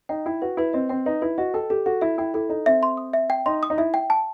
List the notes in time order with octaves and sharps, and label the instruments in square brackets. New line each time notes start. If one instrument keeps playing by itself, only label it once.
[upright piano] D#4 [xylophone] G5
[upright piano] E4 [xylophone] G5
[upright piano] F#4 [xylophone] B4
[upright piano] E4 [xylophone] B4
[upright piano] C4 [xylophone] D#5
[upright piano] C4 [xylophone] G5
[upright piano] D#4 [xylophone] B4
[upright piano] E4 [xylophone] B4
[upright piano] F#4 [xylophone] D#5
[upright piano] A4 [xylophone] G5
[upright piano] G4 [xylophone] A4
[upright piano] F#4 [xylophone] A4
[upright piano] E4 [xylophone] E5
[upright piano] E4 [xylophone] G5
[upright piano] E4 [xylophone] A4
[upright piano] D#4 [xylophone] A4
[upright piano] C4 [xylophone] E5
[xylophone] C6
D#6
E5
G5
[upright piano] D#4 [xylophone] C6
[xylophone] D#6
[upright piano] D#4
[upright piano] E4 [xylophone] E5
[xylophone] G5
A5